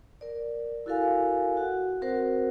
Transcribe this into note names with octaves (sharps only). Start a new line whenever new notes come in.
A#4 D5
E4 F#4 A4 A#4 F5 G#5
F#4 F#5
C4 F#4 A#4 C5 F#5